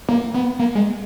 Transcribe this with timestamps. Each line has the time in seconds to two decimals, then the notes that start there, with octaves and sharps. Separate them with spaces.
0.09 A#3
0.34 B3
0.59 A#3
0.75 G#3